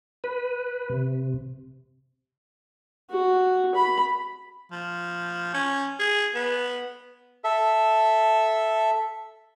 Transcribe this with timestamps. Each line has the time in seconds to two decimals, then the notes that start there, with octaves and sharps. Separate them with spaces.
0.24 B4
0.90 C3
3.11 F#4
3.75 B5
4.72 F3
5.54 C#4
6.00 G#4
6.35 B3
7.44 A4 E5